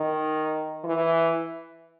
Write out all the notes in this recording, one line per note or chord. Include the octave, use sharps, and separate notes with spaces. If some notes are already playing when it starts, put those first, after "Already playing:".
Already playing: D#3
E3